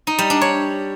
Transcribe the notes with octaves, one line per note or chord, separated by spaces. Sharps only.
D#4
G3
D4
C#5